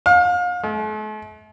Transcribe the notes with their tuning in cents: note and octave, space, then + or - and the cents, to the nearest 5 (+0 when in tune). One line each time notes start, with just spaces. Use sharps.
F5 +35
A3 -45